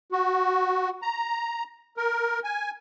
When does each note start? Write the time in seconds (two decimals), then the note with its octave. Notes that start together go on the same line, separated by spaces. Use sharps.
0.12 F#4
1.02 A#5
1.97 A#4
2.44 G#5